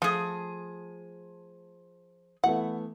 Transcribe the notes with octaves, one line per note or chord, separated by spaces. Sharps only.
F3 A3 G#4
E3 A3 B3 F#5